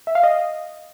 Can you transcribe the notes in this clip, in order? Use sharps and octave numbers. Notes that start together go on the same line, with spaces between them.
E5
F5
D#5